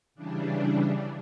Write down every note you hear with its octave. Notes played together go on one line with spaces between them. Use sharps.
C#3 E3 G3 D4